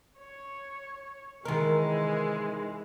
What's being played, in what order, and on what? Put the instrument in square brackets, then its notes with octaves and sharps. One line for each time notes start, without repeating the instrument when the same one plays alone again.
[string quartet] C#5
[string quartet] C3 E3 G#3 [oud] D#3 A#4